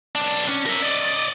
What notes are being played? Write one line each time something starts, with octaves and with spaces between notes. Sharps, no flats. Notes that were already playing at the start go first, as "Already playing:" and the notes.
B1 D4
C#4
A#4 E5
D5 D#5